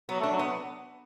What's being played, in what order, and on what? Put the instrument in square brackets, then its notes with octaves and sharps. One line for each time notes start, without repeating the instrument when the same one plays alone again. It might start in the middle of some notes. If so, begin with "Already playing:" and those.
[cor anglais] F#3 [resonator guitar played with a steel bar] B3
[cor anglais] A3
[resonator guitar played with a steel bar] D4
[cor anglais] F#3
[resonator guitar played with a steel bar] B3